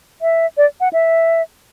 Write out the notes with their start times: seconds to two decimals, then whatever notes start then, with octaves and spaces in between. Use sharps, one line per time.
0.22 E5
0.57 D5
0.81 F#5
0.93 E5